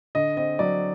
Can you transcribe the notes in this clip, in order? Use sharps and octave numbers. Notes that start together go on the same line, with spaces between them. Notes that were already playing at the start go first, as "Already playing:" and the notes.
D3 D#5
C4 D#5
F#3 D5